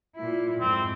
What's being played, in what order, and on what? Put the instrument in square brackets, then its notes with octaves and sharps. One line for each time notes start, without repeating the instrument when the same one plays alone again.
[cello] A#2 E4
[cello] F2 G#2 [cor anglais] C4